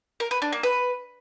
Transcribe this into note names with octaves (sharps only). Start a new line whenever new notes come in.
A#4
B4
D4
A#3
B4